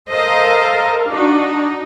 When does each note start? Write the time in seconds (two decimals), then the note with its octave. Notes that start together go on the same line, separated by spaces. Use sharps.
0.10 A4 A#4 C5 D#5 F5
1.10 D4 D#4 F#4